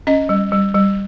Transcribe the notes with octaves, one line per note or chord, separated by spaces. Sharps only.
C#4 D#5
G3
G3
G3